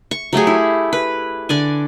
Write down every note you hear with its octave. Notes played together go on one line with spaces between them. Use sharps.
C#6
F#3 A3 G4 G#4
E4
B4
D3 D5 G#5